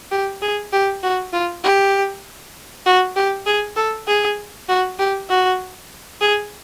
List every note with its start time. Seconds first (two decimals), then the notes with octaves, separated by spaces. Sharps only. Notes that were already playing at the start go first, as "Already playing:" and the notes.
0.11 G4
0.42 G#4
0.73 G4
1.03 F#4
1.33 F4
1.63 G4
2.86 F#4
3.16 G4
3.46 G#4
3.76 A4
4.07 G#4
4.69 F#4
4.99 G4
5.29 F#4
6.21 G#4